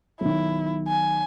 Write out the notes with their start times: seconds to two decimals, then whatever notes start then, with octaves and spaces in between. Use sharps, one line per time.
0.21 B1 D#3 E4
0.88 G#5